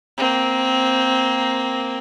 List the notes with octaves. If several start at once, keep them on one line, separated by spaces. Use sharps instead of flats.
A#3 C4